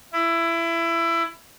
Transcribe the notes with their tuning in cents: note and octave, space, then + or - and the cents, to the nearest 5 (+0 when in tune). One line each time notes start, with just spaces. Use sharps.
E4 +20